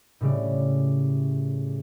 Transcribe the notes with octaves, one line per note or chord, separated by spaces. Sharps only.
A2 C#3 G3